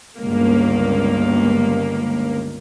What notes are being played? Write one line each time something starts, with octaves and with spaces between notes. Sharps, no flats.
G1 C#2 A#3